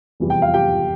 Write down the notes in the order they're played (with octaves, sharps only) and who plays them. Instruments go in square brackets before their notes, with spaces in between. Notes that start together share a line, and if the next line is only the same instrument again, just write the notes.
[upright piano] F1 E2 E3 G3
G5
F5
G4 G5